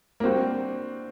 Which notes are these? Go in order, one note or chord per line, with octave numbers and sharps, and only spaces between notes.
A#3
G3 C4 D4 F#4